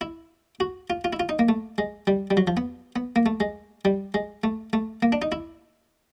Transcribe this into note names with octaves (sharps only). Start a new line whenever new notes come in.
E4
F#4
F4
F4
E4
F4
D#4
A#3
A3
G#3
G3
G3
F#3
F3
B3
B3
A#3
A3
G#3
G3
G#3
A3
A3
A#3
D4
D#4
E4